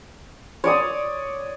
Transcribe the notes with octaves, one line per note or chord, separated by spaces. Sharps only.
C#5 D5 D#6